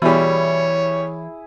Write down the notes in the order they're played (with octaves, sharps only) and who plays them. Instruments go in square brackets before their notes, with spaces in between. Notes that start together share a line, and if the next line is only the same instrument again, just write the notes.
[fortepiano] B2 G3 [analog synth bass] E3 [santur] E4 G#4 [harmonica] C#5